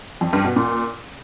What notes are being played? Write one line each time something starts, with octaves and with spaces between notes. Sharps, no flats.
F2
G2
B2
A#2